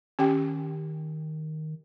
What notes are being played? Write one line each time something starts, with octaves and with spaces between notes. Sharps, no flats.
D#3 C#4 G4 G5